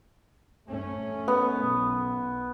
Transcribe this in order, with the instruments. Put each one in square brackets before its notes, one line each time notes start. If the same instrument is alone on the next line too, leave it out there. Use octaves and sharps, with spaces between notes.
[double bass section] A3 C#4
[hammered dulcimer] B3
[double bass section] B1